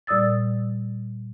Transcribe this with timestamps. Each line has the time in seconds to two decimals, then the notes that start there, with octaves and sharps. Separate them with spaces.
0.07 A#2 G3 D5 D#6 E6 A6